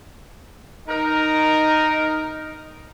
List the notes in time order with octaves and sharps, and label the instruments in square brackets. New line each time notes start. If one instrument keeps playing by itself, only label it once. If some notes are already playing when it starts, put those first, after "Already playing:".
[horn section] D#4 A#4